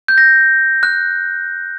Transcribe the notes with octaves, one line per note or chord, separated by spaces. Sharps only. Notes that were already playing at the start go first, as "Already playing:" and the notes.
G6
A#6
F#6